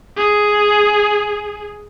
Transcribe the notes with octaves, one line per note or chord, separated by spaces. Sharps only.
G#4